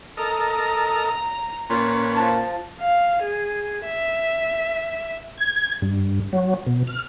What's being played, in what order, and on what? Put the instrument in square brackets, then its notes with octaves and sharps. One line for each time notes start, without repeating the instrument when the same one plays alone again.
[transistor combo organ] A4 A#4 D#5 [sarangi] A#5
[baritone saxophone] A#2 [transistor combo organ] C#4 B4
[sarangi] F3 [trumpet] A5
[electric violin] F5
G#4
E5
[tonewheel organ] G#6
G2
F#3
B2
F6